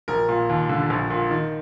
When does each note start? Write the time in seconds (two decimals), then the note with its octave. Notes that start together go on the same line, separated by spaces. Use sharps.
0.08 A#1 A#4
0.29 A#2
0.49 D#2
0.69 D3
0.90 A#1
1.10 A#2
1.31 D#3